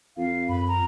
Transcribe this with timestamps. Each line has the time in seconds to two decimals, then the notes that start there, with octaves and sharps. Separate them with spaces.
0.17 F2 F5
0.49 F#2 B5
0.68 A#5